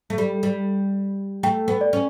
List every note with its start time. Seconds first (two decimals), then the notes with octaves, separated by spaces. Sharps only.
0.10 A3
0.18 G3
0.43 G3
1.43 A3 G5
1.68 B3
1.81 D5
1.93 C#4